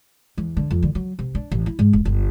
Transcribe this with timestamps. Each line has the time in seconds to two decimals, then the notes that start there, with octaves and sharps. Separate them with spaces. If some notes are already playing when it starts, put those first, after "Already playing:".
0.37 E2
0.57 D3
0.71 F2
0.83 D3
0.95 F#3
1.19 C3
1.35 D4
1.52 A1
1.66 E4
1.79 G#2
1.93 F1
2.05 G1